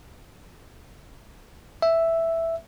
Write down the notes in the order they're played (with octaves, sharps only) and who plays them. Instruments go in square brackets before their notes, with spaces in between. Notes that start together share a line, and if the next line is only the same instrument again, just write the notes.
[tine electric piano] E5